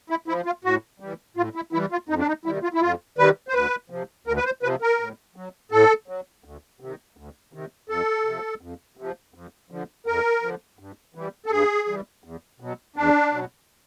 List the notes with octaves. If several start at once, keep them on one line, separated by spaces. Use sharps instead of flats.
E4
F3 E4
F4
A2 F#4
E3 G3
A2 F4
E4
E3 G3 E4
F4
F2 D#4
D4
D#4
C3 D#3 G3 E4
F4
E4
F2 F4
C3 D#3 G3 B4
C5
D2 B4
C3 F3
D2 A#4
B4
C5
C3 F3 B4
A#4
A2
F#3
A2 A4
F#3
D2
C3 D#3
D2
C3 D#3
F2 A4
C3 F3
F2
C3 F3
F2
D3 F3
F2 A#4
D3 F3
G2
E3 G3
A4
G2 G#4
E3 G3
E2
B2 F#3
E2 D4
B2 F#3